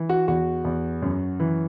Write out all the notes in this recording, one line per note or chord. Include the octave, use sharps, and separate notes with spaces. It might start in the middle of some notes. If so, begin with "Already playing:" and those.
Already playing: E3
F#4
E2 F#4
E2
F#2
E3